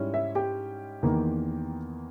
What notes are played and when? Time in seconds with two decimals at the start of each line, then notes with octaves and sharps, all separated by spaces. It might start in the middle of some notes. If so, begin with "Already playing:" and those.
Already playing: G#2 G3 C#4 E4
0.14 E5
0.35 G4 G5
1.03 E2 D#3 A#3